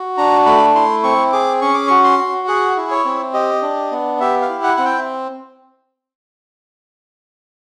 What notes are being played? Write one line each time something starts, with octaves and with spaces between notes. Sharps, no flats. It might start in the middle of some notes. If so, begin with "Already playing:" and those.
Already playing: F#4
D4 A#5
A3 B5
E4 C6
C4 C#6
G#4 D6
C#4 C#6
D6
F#4 C#6
C6
F#4
G#4 F#5
E4
C#5
C4
G4 D#5
D4
B3
G4 E5
F5
E4
F#5
C4 F#5
G5